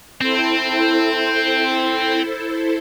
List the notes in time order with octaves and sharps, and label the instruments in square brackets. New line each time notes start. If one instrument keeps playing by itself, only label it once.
[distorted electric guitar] C4 [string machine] E4 A4 C5